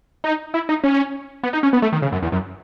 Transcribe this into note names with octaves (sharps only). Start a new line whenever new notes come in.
D#4
E4
D#4
C#4
B3
D#4
C#4
B3
A3
D#3
C#3
F#2
E2
F#2